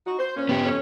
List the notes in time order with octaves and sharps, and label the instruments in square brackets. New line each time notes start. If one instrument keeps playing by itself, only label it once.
[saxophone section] D#4 F#4
C5
A#2 C#4
[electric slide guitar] B3 G4
[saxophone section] F2 C#4